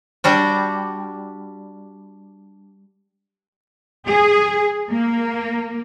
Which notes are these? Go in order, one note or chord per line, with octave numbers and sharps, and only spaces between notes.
G3 D4 F#4
G#4
A#3